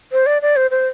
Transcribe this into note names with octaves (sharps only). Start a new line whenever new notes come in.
C5
D5
D5
C5
C5